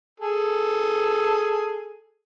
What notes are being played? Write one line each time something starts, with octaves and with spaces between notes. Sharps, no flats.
G#4 A4